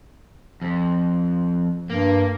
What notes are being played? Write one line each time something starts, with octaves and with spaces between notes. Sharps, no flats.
F2
G2 A#3